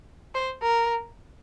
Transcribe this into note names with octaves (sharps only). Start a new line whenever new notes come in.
C5
A#4